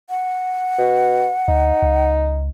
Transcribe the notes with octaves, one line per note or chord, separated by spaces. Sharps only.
F#5
B2
D2 D#4
C#2